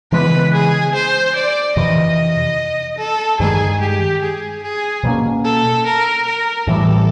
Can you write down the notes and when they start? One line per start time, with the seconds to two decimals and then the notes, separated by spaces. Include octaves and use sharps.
0.12 C#3 E3 G#3 B3 B4
0.53 G#4
0.94 C5
1.35 D5
1.76 F2 C3 E3 D#5
2.98 A4
3.40 G2 D#3 G#3 G#4
3.81 G4
4.22 G#4
4.63 G#4
5.03 B2 F#3 A#3 C#4
5.44 A4
5.85 A#4
6.26 A#4
6.67 A2 E3 G3 A4